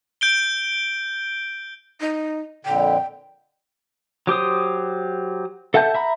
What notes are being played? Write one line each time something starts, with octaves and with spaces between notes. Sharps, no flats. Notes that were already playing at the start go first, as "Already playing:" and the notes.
G6 D7 G7
D#4
F2 A#2 D3 G5
F#3 G4 C5 D#6
A4 E5 F#5 A5 G6
E5 A#5 B5